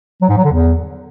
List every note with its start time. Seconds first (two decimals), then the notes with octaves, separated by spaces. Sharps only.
0.22 F#3
0.29 G#2
0.37 F#3
0.44 D3
0.52 E2